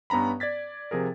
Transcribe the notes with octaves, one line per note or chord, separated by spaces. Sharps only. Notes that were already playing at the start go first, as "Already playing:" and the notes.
G2 B3 C#4 A#5 B5
D5 G#6 A6 B6
C3 F3 G#4 A#4